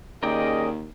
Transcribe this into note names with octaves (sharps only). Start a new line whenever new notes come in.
D#2 C#4 G#4 A#4 D5 D#5 G5